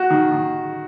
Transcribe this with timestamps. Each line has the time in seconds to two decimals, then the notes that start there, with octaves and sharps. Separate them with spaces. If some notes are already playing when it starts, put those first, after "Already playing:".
Already playing: F#4
0.10 D#3
0.31 D#3